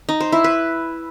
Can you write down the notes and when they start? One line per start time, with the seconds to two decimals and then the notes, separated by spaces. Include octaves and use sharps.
0.09 D#4
0.20 C5
0.32 E4
0.44 B4